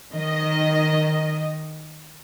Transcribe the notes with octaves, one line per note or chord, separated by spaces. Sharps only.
D#3 D#5